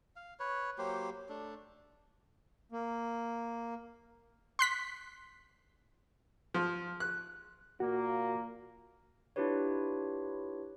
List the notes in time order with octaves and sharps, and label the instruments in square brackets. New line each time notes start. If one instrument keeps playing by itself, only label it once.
[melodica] F5
B4 C#5
F#3 A#3 G4 C5
A3 D4
[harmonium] A#3
[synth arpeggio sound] C6 F#6 B6
[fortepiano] F3
F#6
[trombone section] A#2 A#3 [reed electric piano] F#4
[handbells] D4 E4 F4 G4 B4 C#5